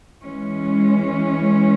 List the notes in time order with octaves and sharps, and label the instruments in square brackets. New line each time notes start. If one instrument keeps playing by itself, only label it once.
[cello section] E3 G#3 C#4